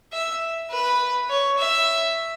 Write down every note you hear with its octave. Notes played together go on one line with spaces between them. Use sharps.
E5
B4
C#5
E5